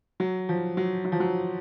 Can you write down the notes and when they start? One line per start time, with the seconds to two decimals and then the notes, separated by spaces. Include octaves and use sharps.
0.20 F#3
0.49 F3
0.77 F#3
1.05 F#3
1.12 F3
1.20 F#3